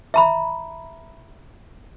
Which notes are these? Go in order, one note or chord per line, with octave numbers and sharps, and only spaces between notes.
E5 A#5 B5